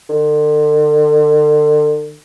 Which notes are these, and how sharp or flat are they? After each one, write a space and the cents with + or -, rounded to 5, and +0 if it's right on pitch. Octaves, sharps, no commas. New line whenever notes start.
D3 +40